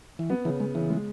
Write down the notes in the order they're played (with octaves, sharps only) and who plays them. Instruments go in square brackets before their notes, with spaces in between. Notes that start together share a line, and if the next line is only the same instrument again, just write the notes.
[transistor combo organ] E3
[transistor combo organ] F#3 [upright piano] B3
[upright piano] C#3 [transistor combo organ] E3
[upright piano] C#3 [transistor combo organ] G#3
[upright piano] C#3 [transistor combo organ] E3
[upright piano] G#3